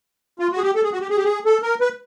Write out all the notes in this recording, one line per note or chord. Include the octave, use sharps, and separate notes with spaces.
F4
F#4
G#4
G4
A4
G#4
F#4
G4
G#4
G4
G#4
A4
A#4
B4